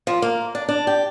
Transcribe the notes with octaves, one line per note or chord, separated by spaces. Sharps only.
F3
A#3
D4
D4
G4